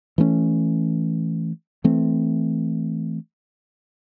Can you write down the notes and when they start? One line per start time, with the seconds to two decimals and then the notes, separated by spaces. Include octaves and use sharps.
0.18 E3 A3 C#4
1.84 E3 A3 C4